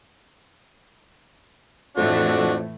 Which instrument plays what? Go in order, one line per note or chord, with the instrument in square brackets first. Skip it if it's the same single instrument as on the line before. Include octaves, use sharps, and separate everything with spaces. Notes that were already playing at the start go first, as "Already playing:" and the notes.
[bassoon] F2 [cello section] A2 E3 A3 [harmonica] D4 F#4